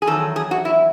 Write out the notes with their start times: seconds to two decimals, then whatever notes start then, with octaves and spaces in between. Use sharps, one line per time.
0.02 G#4
0.07 E2 D#3 F#3 A4
0.36 G#4
0.51 F#4
0.65 E4